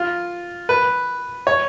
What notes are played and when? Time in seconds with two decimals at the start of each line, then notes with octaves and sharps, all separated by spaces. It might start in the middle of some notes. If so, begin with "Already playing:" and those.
Already playing: F4
0.69 B4
1.47 C#5